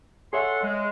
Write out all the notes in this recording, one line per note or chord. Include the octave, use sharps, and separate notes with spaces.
G#4 A4 C#5 E5 F#5 C6
G#3